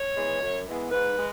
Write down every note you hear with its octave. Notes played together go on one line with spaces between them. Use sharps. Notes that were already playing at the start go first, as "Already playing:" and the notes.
Already playing: C#5
E3 G#3 B3
F#2
E3 G#3 B3
G#2 B4
G#3